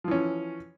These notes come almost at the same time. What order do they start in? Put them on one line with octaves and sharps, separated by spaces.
F3 E3 C#4